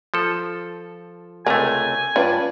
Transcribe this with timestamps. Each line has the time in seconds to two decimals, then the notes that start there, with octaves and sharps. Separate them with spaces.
0.14 F3 A4
1.47 C#2 C3 A3 A#4 G#5 A#5
2.16 G2 C#4 F4 B4 D5